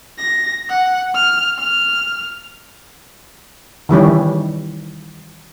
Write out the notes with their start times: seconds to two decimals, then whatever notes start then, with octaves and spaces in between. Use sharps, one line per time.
0.18 A#6
0.69 F#5
1.14 F6
1.58 F6
3.89 D#3 E3 G3 C#4